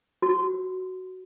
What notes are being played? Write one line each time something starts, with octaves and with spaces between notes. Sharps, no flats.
F#4